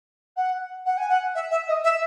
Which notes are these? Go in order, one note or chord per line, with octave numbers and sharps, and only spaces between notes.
F#5
F#5
G#5
F#5
E5
E5
D#5
E5